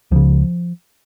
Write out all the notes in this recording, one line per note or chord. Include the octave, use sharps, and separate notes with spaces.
C#2 C#3 F3